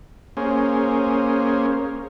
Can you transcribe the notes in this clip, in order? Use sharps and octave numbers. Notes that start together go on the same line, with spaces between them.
A#3 C#4 G#4 C5